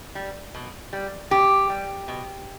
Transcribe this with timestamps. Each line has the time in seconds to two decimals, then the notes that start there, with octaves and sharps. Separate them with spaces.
0.15 G3
0.55 B2
0.93 G3
1.31 B2 G4
1.70 G3
2.08 B2